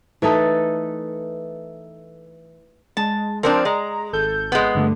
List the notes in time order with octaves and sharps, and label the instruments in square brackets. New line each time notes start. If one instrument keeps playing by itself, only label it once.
[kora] E3 A3 D#4 A4
[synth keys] G#3 [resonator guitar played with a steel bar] A5
[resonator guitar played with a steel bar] F3 C4 D4 [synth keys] A#4
[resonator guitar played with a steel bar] G#3 [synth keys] A#5
[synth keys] G#1 A4 G6
[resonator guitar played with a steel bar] G#3 B3
[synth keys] G2 D3 A3